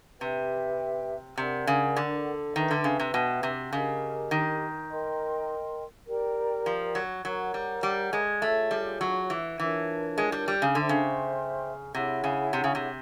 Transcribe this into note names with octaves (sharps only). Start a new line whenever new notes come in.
C3 G4 B4 E5 G5
C3 A#4 D5 F#5
C#3
D3
D#3 B4 E5 G5
D3
C#3
C3
B2
C3
C#3 G4 A#4 D#5
D#3
A#4 D#5 G5 C6
G4 A#4 D5 G5
F3
F#3
F#3 A#4 C#5 F#5 A#5
G3
G3
G#3
A3 F4 G#4 C#5
G3
F#3
E3
E3 D4 F4 A#4 C#5
G#3
G3
G3
C#3
D3 C5 E5 G5 C6
C#3
C3 E4 G#4 C#5 F#5
C#3
C3
C#3
C3